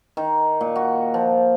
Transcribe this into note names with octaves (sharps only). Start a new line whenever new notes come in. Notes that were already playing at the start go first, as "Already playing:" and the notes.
D#3
A#2
F#4
F3